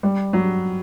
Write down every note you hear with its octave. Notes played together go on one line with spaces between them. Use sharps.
G3
F#3